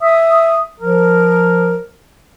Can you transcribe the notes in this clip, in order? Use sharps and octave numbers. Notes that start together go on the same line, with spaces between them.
E5 D#6
F3 A#4